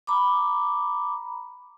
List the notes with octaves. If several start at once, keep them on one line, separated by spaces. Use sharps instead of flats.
A#5 B5 D6